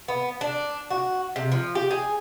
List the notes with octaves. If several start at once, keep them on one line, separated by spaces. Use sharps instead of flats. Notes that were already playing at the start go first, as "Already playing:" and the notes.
B3
D4
F#4
C3
F3
G4
G#4